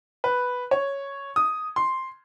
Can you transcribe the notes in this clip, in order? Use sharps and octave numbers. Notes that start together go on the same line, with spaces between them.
B4
C#5
D#6
C6